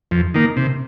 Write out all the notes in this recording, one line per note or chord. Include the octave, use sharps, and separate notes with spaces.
F2
D#3 A#3
C3